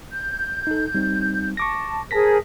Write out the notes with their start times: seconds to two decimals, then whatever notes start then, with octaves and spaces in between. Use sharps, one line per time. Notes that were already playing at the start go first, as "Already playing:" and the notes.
0.11 G6
0.67 D#4 A4
0.94 G3 C4 D#4
1.57 A5 C#6 D6 A#6
2.11 G#4 A#4 C5 A5 A#6 B6